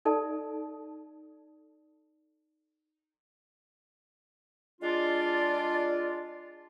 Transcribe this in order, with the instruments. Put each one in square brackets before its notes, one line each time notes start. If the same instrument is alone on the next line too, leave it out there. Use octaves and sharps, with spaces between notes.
[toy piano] D#4 A4 D5 A5
[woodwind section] G#3 D4 F4 D5